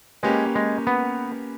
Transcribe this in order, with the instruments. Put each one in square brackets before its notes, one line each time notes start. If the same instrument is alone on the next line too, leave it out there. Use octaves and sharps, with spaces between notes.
[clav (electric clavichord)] G#3 [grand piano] A#3 C#4 G4 B4
[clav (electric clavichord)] G#3
B3